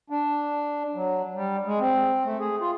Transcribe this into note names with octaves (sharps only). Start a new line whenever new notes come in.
D4
F#3
G3
G#3
C4
A3
G#4
F4